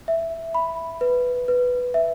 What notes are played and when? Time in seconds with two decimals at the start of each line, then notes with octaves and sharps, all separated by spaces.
0.08 E5
0.55 B5
1.01 B4
1.48 B4
1.94 E5